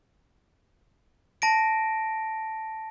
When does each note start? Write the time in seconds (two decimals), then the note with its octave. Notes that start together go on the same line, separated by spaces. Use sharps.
1.42 A5 A#6 D7